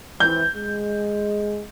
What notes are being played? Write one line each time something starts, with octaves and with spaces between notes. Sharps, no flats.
E3 C4 G6
G#3